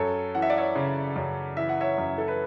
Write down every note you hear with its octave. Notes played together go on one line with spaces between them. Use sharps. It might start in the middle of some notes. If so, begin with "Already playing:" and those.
Already playing: F#2 A4 C#5
E3 F#5
E5
D5
C#5 E5
C#3
F#2
E3 E5
F#5
C#5 E5
F#2
A4
B4